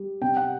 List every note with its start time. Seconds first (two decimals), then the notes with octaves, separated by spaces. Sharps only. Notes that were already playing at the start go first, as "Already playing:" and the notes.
Already playing: G3
0.22 C3 G5
0.37 F#5